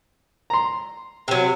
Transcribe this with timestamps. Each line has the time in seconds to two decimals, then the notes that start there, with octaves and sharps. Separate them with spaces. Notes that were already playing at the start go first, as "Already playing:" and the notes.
0.50 A#5 C6
1.28 C3 F#3